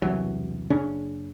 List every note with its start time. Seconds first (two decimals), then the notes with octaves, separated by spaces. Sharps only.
0.02 E1 C2 E3 F#3
0.70 F#1 C#3 C#4 D4